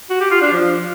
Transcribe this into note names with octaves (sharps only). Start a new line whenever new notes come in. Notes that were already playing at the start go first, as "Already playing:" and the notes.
F#4
G4
F4
D4
F3